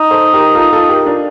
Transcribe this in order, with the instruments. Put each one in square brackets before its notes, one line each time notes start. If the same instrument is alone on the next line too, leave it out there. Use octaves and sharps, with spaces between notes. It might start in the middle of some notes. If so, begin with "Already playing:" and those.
Already playing: [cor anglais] D#4
[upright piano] A4 C5
G4 A#4
F4 A4
F4 A4
G4 A#4
D4 F4